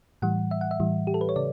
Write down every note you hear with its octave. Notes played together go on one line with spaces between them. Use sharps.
A2 E3 G3 F#5
E5
F#5
E5
A2 E3 G3
G4
A4
B4
C#5
C#3 D5